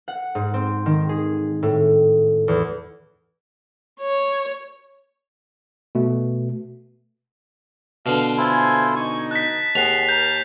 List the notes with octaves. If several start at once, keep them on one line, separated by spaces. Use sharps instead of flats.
F#5
G#2
C4
D#3
G#4
A2
E2
C#5
B2 A3
B2 D3 F5
E4 F4 A4 C5 G#5
D#4 G#5 C#6
A5 F#6 B6
D#2 C4 G#4 F#5 C7 F7
A#4 A5 G6